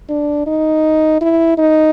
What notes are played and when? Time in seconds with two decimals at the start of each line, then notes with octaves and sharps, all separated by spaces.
0.09 D4
0.47 D#4
1.21 E4
1.58 D#4